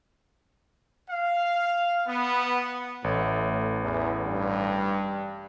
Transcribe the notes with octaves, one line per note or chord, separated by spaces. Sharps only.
F5
B3
A1 A2
E2
G2